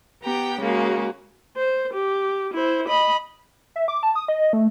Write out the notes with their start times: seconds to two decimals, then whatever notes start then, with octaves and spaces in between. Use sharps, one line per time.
0.23 B3 G4 G5 A#5
0.60 C#3 G#3 A#3 F#4 G#4
1.57 C5
1.93 G4
2.54 E4 C5
2.88 D#5 B5
3.76 E5
3.88 D6
4.03 A5
4.15 D#6
4.28 D#5
4.53 A3